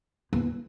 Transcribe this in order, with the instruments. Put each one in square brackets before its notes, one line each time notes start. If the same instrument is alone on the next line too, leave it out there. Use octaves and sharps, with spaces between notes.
[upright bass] E2